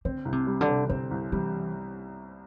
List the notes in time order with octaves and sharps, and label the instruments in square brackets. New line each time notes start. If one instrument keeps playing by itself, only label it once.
[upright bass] D3 [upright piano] C4
[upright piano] C2
[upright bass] C3
[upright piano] G3
[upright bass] D3
[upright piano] C3
[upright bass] D3 [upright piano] C4
[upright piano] C2
[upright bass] E3 [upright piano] G3